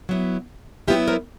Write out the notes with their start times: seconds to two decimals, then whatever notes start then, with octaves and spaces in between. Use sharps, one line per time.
0.09 F#3 B3 E4
0.88 F#3 B3 E4 F4 G4
1.08 A#4 C5